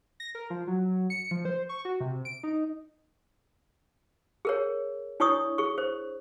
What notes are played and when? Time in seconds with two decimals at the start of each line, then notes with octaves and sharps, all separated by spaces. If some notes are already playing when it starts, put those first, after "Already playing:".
0.20 A#6
0.35 A#4
0.50 F3
0.67 F#3
1.10 C#7
1.31 F3
1.45 C5
1.69 C#6
1.85 F#4
2.00 C3
2.25 D7
2.43 D#4
4.45 G#4 A#4 C#5
5.20 D4 E4 C#5 D5 C#6 D#6
5.58 G#4 C#6
5.78 C5